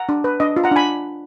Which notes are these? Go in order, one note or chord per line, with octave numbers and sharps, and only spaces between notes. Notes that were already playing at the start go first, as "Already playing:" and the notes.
Already playing: F#5 A#5
D4
B4
D4 D#5
F4
F#5 A#5
D4 G#5 B5